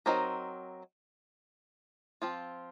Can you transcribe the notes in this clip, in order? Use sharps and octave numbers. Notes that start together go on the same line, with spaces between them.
F#3 C4 D#4 A#4 D#5
F3 C4 F4